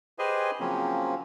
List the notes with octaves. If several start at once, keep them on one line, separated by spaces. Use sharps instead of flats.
G4 G#4 B4 C5 D#5 G#5
C#3 F3 F#3 A#3 C4 C#4